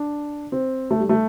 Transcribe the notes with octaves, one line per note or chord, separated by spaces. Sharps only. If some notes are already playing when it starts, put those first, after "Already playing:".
Already playing: D4
C4
A3
G3
A3